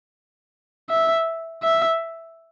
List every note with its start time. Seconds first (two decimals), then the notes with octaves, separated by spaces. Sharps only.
0.90 E5
1.63 E5